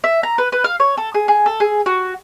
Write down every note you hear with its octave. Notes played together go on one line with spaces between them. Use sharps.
E5
A#5
B4
B4
F5
C#5
A4
G#4
G#4
A4
G#4
F#4